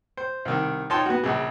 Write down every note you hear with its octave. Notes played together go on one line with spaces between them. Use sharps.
C5
C2 D#3
D#4 F4 C#5 G5 A5 C6
B3 F#4
A#1 C#3